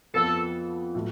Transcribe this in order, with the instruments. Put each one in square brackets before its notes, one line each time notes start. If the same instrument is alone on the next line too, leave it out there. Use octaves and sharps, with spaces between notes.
[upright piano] F2 F3 B3 F4 [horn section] A4
[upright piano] A2 F#3